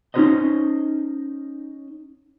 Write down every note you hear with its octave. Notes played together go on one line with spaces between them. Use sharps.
C#4 D#4 E4 B4 C5 D#5